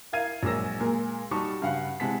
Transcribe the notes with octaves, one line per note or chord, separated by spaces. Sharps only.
E4 A#4 F5 G#6 D#7
A#1 F#3 G#3 A#4 E6 A#6
A#2 G#3 A#3 A#4
G3 D#4 F#4 A5 C#6
G2 C#3 F5 F#5
C3 E3 G#3 F#5 A5 B6